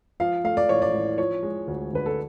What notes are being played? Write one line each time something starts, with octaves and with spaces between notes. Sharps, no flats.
F3 F5
A3 F5
D5
A1 C#5
D5
A2
F3 C#5
G#3
D2
D3 B4
A4